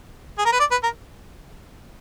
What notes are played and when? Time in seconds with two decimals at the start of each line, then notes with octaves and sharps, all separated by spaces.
0.38 G#4
0.45 A#4
0.52 B4
0.60 D5
0.71 B4
0.83 A#4